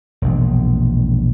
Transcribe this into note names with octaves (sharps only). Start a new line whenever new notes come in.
E1 A#1 G#3